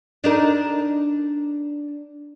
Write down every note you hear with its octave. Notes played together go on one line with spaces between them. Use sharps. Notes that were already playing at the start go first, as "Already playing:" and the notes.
D4 D#4 A#4